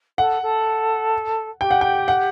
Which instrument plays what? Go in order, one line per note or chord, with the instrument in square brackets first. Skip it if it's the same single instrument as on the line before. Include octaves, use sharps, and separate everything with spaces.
[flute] A4 [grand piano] F#5
[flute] A4
[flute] G4 [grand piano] G5
[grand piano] F#5
G5
F#5